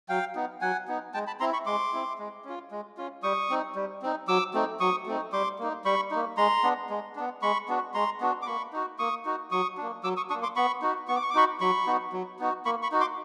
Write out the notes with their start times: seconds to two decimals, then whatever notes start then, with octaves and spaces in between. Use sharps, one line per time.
0.09 F#3 F5 G5
0.35 B3 D#4
0.61 F#3 F#5 G#5
0.88 B3 D#4
1.14 G#3 G5 A5
1.27 A5 B5
1.40 C4 E4 A#5 C6
1.53 B5 C#6
1.66 G#3 C6 D6
1.93 C4 E4
2.18 G#3
2.45 C#4 F4
2.71 G#3
2.97 C#4 F4
3.23 G3 C#6 D#6
3.50 C4 D#4
3.75 G3
4.02 C4 D#4
4.28 F#3 D6 E6
4.54 A3 C4 D#4
4.80 F#3 C#6 D#6
5.06 A3 C4 D#4
5.33 G3 C6 D6
5.59 A#3 D#4
5.85 G3 B5 C#6
6.11 A#3 D#4
6.37 G#3 A#5 C6
6.63 B3 D4
6.90 G#3
7.16 B3 D4
7.42 G#3 B5 C#6
7.68 B3 D4 F#4
7.94 G#3 A#5 C6
8.21 B3 D4 F#4
8.42 D6
8.46 A#3 B5 C#6
8.73 D#4 F#4
8.99 A#3 C#6 D#6
9.25 D#4 F#4
9.52 F#3 C#6 D#6
9.78 A#3 D4
10.04 F#3 D6 E6
10.17 C#6 D#6
10.30 A#3 D4 C#6 D#6
10.43 C6 D6
10.56 B3 B5 C#6
10.82 D#4 F#4
11.08 B3 C#6
11.16 D6
11.23 C#6
11.30 D6
11.35 D#4 F#4 B5 C#6
11.61 F#3 B5 C#6
11.87 B3 D#4 F#4
12.13 F#3
12.39 B3 D#4 F#4
12.65 A#3 B5 C#6
12.83 B5 C#6
12.92 D#4 F#4
13.00 C6 D6